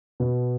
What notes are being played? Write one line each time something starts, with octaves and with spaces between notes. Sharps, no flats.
B2